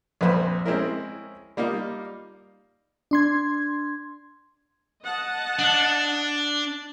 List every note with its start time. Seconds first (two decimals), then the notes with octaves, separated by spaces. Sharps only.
0.21 A#1 F2 B4 C5
0.65 G#3 C4 C#4 E4 A#4
1.57 G3 A#3 D#4 F4
3.11 D4 C6 G#6
5.03 D#5 F#5 A5
5.59 D4